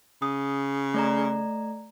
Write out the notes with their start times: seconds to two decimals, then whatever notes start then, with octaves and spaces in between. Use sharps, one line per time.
0.22 C#3 D#6
0.94 A3 D5 A#5